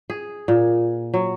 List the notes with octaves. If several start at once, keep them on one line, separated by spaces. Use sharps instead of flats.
G#4
A#2
F#3